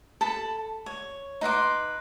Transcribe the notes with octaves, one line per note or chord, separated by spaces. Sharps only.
A4 A5 B5
C#5
D#4 B4 C6 D6